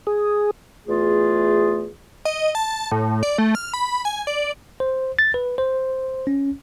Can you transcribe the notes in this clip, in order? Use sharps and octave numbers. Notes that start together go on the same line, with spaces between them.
G#4
E2 A3 F4 G#4
D#5
A5
A2
D5
A3
F6
B5
G#5
D5
C5
A6
B4
C5
C#4